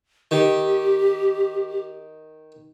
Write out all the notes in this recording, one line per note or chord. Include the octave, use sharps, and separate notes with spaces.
D#3 G4